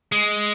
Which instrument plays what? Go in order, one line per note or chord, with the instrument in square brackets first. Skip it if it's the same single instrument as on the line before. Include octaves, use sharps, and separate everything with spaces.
[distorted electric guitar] G#3